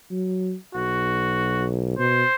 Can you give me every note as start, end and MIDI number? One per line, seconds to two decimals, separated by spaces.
0.11 0.54 54
0.75 1.95 35
0.75 1.66 66
1.99 2.23 47
1.99 2.35 72